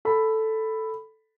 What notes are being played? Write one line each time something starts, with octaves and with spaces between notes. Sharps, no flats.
A4 B5